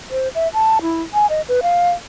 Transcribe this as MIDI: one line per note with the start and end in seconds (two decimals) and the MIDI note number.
0.11 0.28 72
0.35 0.48 76
0.53 0.78 81
0.82 1.02 64
1.13 1.26 80
1.30 1.41 75
1.48 1.60 71
1.63 1.90 77